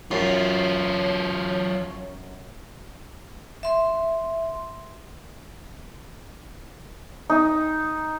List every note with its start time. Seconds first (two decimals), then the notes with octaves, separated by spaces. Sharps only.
0.11 F#2 F#3 F4 C#5
3.63 E5 C6
7.30 D#4